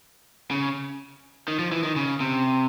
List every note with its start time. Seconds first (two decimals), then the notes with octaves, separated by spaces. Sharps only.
0.51 C#3
1.48 D#3
1.59 F3
1.72 E3
1.83 D#3
1.96 C#3
2.20 C3